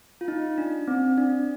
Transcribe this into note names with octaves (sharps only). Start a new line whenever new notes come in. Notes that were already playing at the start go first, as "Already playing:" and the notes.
F4
D#4
D4
C4
D4